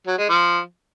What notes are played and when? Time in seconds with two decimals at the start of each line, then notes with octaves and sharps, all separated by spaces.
0.07 F#3
0.18 G#3
0.29 F3